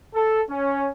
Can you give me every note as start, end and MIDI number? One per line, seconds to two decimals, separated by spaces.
0.15 0.42 69
0.49 0.88 61